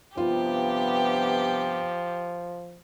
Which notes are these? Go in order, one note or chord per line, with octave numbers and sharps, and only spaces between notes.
G2 C3 F3 B3 F4 G4